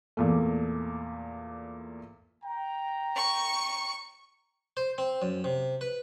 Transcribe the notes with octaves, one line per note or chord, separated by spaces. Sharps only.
E2 A#2 A3
G5 A#5
C#6 C#7
C5
C4
F#2
C3
B4